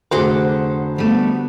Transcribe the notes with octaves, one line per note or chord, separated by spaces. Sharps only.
F1 D3 F#4 G#4 C5 D6
G3 A3 B3